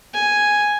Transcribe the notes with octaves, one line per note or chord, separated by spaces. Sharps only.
G#5